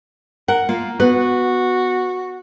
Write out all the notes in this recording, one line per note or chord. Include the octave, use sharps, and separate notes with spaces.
A#4 F#5
A#3 F4
B3 F#4 B4